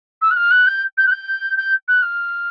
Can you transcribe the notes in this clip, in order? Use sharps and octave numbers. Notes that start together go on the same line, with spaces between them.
E6
F#6
F6
F#6
G6
G6
F#6
G6
G6
F#6
F6